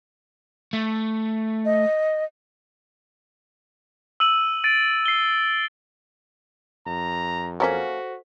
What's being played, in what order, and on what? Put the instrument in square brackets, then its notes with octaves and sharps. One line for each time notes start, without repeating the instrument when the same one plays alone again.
[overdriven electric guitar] A3
[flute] D#5
[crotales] E6 D#7 F#7
A6 D7 D#7
C7 G7
[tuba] F2 [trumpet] A#5
[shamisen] F#3 A#3 C#4 [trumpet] F#4 [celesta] A4 C5 B6